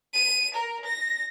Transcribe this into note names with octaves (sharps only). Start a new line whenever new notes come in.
D#7
A#4
A#6